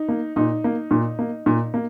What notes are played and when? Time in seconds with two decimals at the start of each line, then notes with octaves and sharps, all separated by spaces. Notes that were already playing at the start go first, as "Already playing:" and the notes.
Already playing: D#4
0.09 A#3
0.36 A#2 D#4
0.64 A#3
0.91 A#2
1.19 A#3
1.46 A#2
1.74 A#3